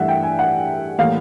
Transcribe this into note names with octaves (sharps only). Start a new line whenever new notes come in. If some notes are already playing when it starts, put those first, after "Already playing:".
Already playing: G2 E3 A3 E5 F#5
G5
G#5
F#5
A2 E3 G3 A#3 F5